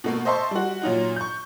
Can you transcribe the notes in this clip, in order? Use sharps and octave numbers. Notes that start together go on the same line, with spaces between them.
B2 A3 A#3
C5 D#5 E5 A5 C6 C#6
G3 F#4
A#2 F#3 D#4 F4
C#6 G6